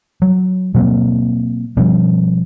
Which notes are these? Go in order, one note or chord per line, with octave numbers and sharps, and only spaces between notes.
F#3
B2 F#3 A#3 C4
B2 F3 G3 C#4